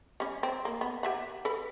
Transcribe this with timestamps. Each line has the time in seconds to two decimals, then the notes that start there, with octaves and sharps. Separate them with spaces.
0.20 G3 C#4
0.43 C4
0.65 A#3
0.81 B3
1.03 G4 E5 F#5
1.45 A4 B4